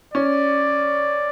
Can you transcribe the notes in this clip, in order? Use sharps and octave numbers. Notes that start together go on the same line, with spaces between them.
C#4 D5